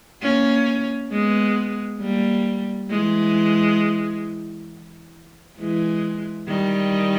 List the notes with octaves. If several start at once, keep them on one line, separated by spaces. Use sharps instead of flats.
A#3 C#4
G#3 B3
G3 A#3
E3 G#3
E3 G#3
D#3 G3